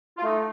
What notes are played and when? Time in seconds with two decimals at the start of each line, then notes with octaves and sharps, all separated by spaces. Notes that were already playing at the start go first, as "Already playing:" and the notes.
0.18 F4
0.24 A3 D#4